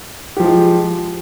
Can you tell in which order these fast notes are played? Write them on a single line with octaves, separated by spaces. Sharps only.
G4 F3 G#3